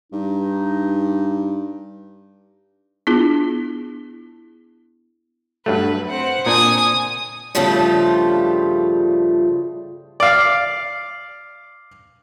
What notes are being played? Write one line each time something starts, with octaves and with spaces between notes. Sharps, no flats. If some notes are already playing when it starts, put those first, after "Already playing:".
G2 D#4
B3 D4 E4 F4 G#4
G2 F#3 A3 B4
C4 F#5
A#2 D4 G#5 D#6
G2 C#3 F3 G3 A3 F4
D5 F5